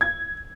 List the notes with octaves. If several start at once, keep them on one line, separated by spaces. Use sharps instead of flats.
G#6